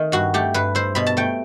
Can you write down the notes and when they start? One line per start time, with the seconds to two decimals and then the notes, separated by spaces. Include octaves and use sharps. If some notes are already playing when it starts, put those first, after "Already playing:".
Already playing: D#3 A3
0.12 G2 F#4
0.34 A3 G4
0.54 G2 B4
0.75 E4 C5
0.95 B2 B5
1.07 A5
1.17 A3 G5